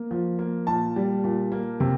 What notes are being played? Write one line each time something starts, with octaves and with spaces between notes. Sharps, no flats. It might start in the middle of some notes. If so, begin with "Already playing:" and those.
Already playing: A#3
F3
A#3
A#2 A5
G3
A#2
A#3
C3